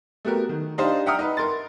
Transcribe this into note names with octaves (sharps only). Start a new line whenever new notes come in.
A3 B3 F#4 G4 A#4
D#3
D4 D#4 G4 C5 F5 C6
E5 F#5 G5 A#5 D#6 F6
D#4 B4
A#4 C6 A6